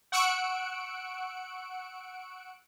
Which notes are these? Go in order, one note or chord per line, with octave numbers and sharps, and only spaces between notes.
F#5 C#6 E6 F#6 C#7 D7